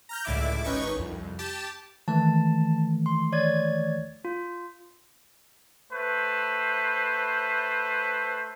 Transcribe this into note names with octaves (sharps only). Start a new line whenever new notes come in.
A#5 F6 G6
C#2 A2 D3 E4 E5 D6
G#1 C#4 D#4 B4 C#6
C2 F2
G4 A5
D#3 E3 A3 A5
C6
C#5 D5 G#6
F4
A3 B4 C5